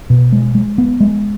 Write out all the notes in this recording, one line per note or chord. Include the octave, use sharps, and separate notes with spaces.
B2
G#3
G#3
B3
G#3